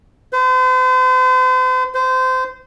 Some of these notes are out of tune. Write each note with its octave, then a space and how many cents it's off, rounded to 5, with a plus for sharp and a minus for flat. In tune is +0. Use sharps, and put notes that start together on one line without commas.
C5 -40
C5 -25